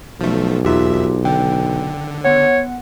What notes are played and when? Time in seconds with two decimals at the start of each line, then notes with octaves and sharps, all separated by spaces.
0.21 B1 F3 A3
0.65 E2 D#4 F4 G4 E5
1.25 D3 G5
2.25 B3 C#5 F#5